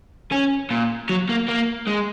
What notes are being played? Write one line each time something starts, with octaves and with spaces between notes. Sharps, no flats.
C#4
A#2
F#3
A#3
A#3
G#3